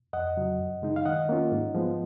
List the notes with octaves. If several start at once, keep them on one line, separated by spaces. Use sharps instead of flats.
F2 D#5 F#5
C#3 F#3
F#2
C#3 G#3 D#4
F5
D#3 D#5 F#5
A#3 C#4 F4
G#2
F3 G#3 B3